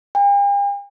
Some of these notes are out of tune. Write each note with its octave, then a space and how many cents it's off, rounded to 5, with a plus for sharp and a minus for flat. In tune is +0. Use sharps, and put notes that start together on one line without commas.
G5 +45